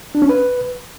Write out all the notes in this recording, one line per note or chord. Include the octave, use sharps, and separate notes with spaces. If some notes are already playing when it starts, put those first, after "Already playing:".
D4
C#4
B4